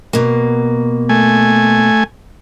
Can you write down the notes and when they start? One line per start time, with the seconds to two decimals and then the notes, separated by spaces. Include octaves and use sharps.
0.13 B2 A#3
1.09 A3 G#5